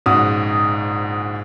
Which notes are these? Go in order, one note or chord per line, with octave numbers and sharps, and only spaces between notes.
A#1 G#2 C#3 F#4 D#6